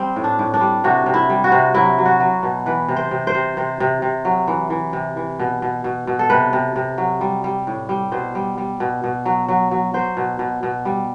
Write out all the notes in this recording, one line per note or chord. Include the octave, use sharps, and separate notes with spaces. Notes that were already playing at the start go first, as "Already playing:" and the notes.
Already playing: G3 C4
A2
D4
A2
D4
G3
C3 F#4
C3
E4
G3
F#4
C3
F#3 E4
F#3
F#4
F#3
B2
E3 B4
C3
C5
C3
C5
C3
C3 C5
C3
C3
F#3
E3
E3
C3
E3
B2
B2
B2
B2
A4
C3 B4
C3
C3
F#3
G3
G3
A2
G3
B2 C5
G3
G3
B2
B2
F#3
F#3
F#3
F#3 C5
B2
B2
B2
G3